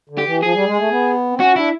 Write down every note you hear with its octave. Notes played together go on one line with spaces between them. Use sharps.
D3
G4
E3
F3 G#4
G3
G#3
A3
B3
C4
C#4 F#4
D4 E4